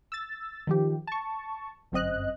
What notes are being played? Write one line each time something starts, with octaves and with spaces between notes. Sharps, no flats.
E6 A6
D#3 F3 G4
A5 C#6
G1 F#2 C4 D#5 F#6